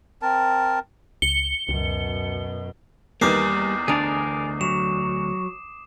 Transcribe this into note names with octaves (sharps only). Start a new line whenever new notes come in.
C4 A#4 A5
C#2 C#7 G7
C#2 F#2 B2
E2 D#3 G3 A#3 B3 D6 D#6 C7
D2 D4 G#4 A#4 D5
F#3 E7